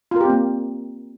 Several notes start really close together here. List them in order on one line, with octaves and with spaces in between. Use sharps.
F4 A#4 G4 C4 A#3